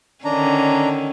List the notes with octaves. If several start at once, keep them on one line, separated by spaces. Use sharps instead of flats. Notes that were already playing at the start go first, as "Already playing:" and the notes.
D3 D#3 C#4 D4 A#5